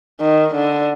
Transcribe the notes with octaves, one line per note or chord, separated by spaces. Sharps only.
D#3
D3